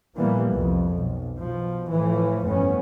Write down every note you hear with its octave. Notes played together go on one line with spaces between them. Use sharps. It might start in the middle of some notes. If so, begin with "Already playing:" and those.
A#2 E3 F3 G3 A#3 B3
C2 F2
B1
B2 F3
A2 E3 F3 A3
G1 F2 A2 B3 C#4